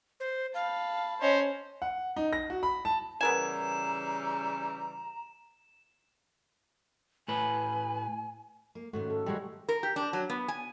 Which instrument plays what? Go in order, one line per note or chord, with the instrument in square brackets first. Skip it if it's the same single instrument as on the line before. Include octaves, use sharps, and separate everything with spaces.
[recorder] C5
[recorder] F5 [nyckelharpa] A5 B5
[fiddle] C#4 [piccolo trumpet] C5 [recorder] D#5
[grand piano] F#5
D#4
A#6
F#4
B5
A5
[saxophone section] C#3 E3 G3 [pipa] B3 A#4 G#5 [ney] A#5 [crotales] E7
[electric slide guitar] A2 B4 [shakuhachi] G#5
[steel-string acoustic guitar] A#3
[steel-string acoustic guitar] G#2 D#3 C#4 [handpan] A3 [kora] F#4
[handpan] A4
[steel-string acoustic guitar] D#3 C4 D#4 [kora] G3 G#3 F#4
[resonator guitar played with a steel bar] A#4
G4
D4
F#3
B3
G#5